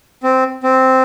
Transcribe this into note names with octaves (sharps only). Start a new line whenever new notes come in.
C4
C4